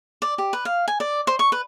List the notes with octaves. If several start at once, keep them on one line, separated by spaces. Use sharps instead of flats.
D5
G4
B4
F5
G#5
D5
C5
C#6
B4